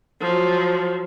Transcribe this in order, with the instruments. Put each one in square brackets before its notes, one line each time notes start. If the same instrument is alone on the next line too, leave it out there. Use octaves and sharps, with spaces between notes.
[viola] F3 F#3